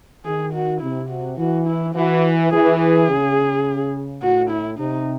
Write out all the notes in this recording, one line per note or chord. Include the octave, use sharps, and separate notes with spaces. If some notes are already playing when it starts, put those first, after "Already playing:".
D#3 G#4
F#4
C3 E4
F#4
E3 F#4
E4
E3 F#4
E3 G#4
G#4
C#3
A2 F#4
E4
C3 D#4